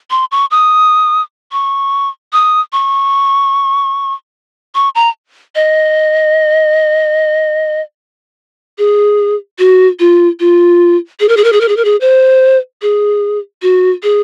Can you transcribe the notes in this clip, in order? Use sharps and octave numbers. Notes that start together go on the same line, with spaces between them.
C6
C#6
D#6
C#6
D#6
C#6
C#6
A#5
D#5
G#4
F#4
F4
F4
G#4
A#4
G#4
A#4
G#4
A#4
G#4
A#4
G#4
C5
G#4
F#4
G#4